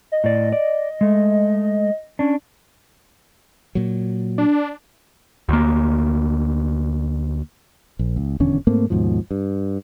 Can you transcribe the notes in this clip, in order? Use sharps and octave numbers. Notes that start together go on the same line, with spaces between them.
D#5
A2 D5
D5
G#3 A3
C#4 D4
A#2 F#3
D4
D2 A#3
A#1
C#2
D#1 E2 D3 C#4
G#2 A3 A#3 C4
D#2 G#2 B2 F3
G2